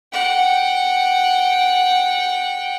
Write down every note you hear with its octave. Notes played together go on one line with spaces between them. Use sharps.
F#5 G5